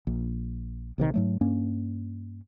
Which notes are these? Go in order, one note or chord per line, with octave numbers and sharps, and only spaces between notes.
A#1
A#1 C3 D#3
G#2 F#3 A3
G2 A#3 C#4